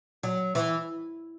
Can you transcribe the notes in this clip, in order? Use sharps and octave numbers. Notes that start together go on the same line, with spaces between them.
F#3
E3